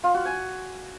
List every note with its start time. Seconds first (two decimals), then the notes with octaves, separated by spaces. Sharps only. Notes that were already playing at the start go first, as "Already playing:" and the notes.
0.04 F4
0.14 F#4
0.25 G#5